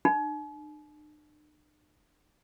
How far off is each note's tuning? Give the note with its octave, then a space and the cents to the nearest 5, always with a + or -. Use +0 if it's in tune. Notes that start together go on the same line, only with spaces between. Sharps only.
D4 +45